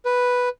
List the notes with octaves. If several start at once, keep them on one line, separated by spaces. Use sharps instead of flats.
B4